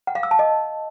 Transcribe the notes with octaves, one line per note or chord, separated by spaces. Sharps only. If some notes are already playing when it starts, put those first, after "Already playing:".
F#5
F5
E6
A5
D#5